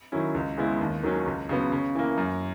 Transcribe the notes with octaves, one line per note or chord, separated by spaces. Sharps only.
D#3 F#3 C#4 E4
C#2
C#3 G#3 B3 E4
D#2
D#3 F#3 C#4
C#2
C#3 F#3 B3
C#3
E3 A#3
F#2